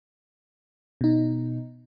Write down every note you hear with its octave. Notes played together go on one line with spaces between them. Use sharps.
B2 D#4